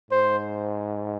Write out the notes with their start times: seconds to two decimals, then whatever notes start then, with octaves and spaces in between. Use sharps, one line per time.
0.11 G#2 C5